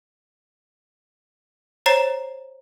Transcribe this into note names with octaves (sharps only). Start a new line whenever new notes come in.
C5 C#5 A#5 A6 C7 E7